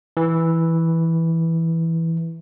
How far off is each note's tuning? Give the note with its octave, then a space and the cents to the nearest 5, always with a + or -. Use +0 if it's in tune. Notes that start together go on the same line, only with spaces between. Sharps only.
E3 -5